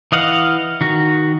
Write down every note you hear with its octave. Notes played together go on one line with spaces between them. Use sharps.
E3 D#5 F5 F#5
D#3 F#4